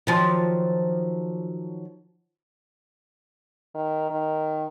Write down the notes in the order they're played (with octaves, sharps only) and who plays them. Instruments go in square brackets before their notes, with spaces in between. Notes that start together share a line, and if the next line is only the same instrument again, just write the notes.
[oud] D#3 F3 F#3
[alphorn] D#3
D#3